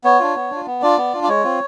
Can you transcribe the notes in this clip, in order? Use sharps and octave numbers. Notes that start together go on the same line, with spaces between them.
B3 C#5
D4 F4
B3
D4 F4
B3
D4 F4 D5
B3
D4 F4
D5
G#3 C#5
C4 F4